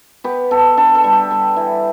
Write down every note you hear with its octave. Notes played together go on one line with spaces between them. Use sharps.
B3 G4 B4
B3 A4
D3 A4
A4
G3
G4
G3
E3